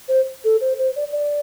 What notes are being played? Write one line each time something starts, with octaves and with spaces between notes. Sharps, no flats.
C5
A4
C5
C5
D5
D5